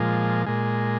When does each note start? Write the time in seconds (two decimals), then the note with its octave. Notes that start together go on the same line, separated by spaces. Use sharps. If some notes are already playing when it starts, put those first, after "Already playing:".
Already playing: A#2 F3 G#3
0.46 A#2 G#3